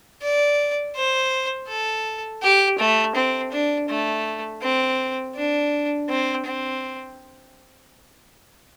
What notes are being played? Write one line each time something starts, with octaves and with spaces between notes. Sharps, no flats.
D5
C5
A4
G4
A3
C4
D4
A3
C4
D4
C4
C4